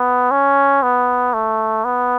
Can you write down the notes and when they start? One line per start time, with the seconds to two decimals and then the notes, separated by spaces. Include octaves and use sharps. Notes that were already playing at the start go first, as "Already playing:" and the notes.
Already playing: B3
0.31 C#4
0.83 B3
1.34 A3
1.85 B3